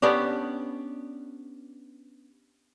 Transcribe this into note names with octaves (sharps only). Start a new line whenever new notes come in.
B3 C#4 D4 G4